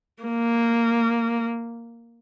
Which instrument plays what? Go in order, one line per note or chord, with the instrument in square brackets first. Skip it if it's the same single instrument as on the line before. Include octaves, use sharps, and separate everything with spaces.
[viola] A#3